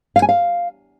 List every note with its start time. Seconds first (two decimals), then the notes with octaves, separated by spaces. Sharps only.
0.16 F5
0.22 G#5
0.29 F5